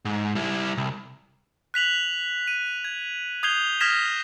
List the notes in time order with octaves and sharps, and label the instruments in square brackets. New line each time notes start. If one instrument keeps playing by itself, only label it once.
[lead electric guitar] G#2
G3 E4
C2
[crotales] F#6 B6 F7 F#7
D#7
G#6
D#6 G6 G#6 C7 F7 G7
D#6 F6 G#6 A#6 B6 E7